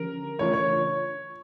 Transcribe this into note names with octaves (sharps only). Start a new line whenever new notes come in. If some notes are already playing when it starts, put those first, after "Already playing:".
Already playing: D3 F3 C#4 G4 A#4
C#3 E3 A3 D4 F4 C#5
C#5